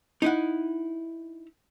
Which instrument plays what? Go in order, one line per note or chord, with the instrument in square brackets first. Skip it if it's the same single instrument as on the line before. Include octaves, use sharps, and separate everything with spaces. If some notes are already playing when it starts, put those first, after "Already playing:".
[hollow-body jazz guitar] D#4 E4 F#5